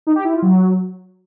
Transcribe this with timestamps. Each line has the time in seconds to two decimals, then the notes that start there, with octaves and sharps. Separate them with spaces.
0.07 D#4
0.16 G4
0.25 E4
0.33 F4
0.42 F#3